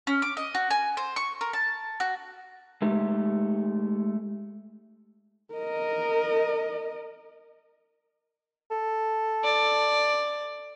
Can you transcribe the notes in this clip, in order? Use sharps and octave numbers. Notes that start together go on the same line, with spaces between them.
C#4
D6
D#5
F#4
G#5
C5
C#6
A#4
A5
F#4
G#3 A3 D#4 G4
A#4 D#5
A4
D5